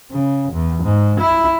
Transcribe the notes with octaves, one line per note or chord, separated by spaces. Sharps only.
C#3
E2
G#2
E4